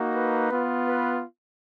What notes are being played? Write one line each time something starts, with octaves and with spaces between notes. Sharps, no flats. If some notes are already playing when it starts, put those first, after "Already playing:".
Already playing: A#3 D#4 F#4
B4
B3 F4
B4